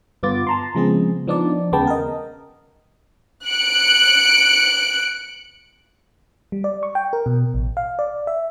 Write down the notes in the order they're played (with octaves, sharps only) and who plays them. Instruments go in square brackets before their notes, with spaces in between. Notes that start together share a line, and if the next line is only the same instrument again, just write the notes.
[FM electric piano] G2 D3 B3 F4 D6 A6
A5 A#5 C6
C#3 F3 G#3 B3 C4 G#4
F3 B3 D4 D#4 D5
D#2 C#3 G#3 B3 G5 A5
A#4 D#5
[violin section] F#6 C#7 D7
[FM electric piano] G3
D5
C#6
G5
A#4
B2
A1
F5
D5
E5